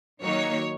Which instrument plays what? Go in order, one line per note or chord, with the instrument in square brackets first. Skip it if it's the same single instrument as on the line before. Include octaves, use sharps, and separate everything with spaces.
[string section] D#3 F#3 A#3 D#4 C#5